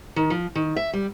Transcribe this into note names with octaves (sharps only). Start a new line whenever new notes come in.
D#3
F3
D#3
E5
G3